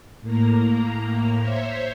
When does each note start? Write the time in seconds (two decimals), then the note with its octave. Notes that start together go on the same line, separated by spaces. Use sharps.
0.22 A2 A#3 A#5
1.39 C5 C#5 E5